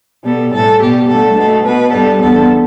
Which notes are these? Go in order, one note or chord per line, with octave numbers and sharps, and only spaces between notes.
B2 G3 B3 A4
A2 E3 G3 A4
B2 G3 B3 G4
G2 D3 A3 A4
B2 A3 A4
B2 B3 B4
G2 G3 B3 A4
E2 D3 B3 A4